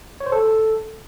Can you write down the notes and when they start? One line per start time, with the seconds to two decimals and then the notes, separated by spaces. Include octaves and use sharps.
0.20 C#5
0.26 C5
0.32 A4